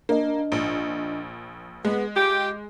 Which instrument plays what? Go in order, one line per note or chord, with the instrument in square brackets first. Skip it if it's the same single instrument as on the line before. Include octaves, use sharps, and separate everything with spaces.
[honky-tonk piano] A#3 [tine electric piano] D4 D#5
[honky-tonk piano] A#1
[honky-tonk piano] G#3 [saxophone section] B3 [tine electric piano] G#4
[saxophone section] F4 G4 [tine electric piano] D6 G6